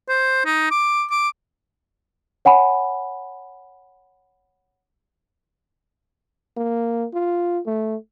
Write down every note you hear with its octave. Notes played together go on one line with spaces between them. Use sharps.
C5
D#4
D6
D6
C#5 F#5 G#5 B5
A#3
F4
A3